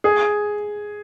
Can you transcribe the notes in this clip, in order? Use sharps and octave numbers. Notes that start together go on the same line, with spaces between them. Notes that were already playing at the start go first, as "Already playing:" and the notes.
G#4